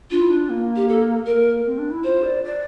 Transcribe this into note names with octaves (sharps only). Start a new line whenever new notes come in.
D4 F4
E4
D4
A#3
G4
A4
A#3 A#4
C4
D4
E4
F4 C5
D5
D5